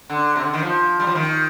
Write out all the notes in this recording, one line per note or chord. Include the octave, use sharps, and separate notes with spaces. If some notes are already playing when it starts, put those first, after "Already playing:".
D3
C3
D3
D#3
F3
G3
F3
D#3